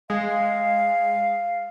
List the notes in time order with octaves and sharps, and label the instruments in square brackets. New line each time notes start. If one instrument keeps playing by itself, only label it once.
[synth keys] G#3 [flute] F5